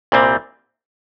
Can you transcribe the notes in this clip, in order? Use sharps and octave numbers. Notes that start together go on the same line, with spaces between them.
C2 A#2 G3 C4